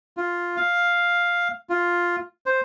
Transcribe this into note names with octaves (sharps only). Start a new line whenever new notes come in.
F4
F5
F4
C5